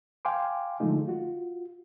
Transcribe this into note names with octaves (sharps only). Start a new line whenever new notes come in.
F5 G5 G#5 C6 D6
D3 F3 G#3 A3 D#4
F4 F#4